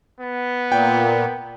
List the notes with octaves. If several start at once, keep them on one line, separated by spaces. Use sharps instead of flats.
B3
A#2 G5